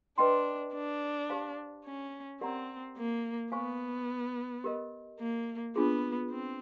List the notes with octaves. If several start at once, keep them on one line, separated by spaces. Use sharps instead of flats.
D4 B4 D#5 G5 C6
D4
G4 C5 F5 A5
C#4
C4 G4 A#4 D5 F#5 A#5
A#3
B3 C5 F5 G#5 C#6
G4 A#4 D#5
A#3
B3 D4 F4 G#4
C4